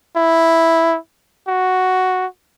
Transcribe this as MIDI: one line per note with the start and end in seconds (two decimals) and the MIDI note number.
0.16 0.97 64
1.48 2.26 66